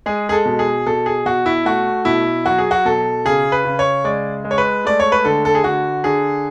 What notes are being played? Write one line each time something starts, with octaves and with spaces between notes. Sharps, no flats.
G#3 G#4
G#4
A4
B2
G#4
B2 A4
G#4
B2 F#4
E4
A3 F#4
B2 E4
F#3 F#4
G#4
F#4
B2 A4
C#3 G#4
B4
C#3
C#5
G#3 D5
G#3
C#5
B4
A3 D5
C#5
B4
D3 A4
A4
G#4
D3 F#4
D3 G#4